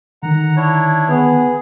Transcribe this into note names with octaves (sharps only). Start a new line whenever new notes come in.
D3 D#3 F#5 A#5
D4 E4 C#5
B3 G#4